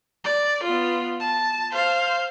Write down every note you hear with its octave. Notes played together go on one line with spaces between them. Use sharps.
D5
B3 F4
A5
C5 F5